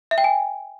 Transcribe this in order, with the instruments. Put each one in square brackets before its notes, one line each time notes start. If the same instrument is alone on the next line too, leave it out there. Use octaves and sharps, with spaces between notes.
[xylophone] E5
G5
G#5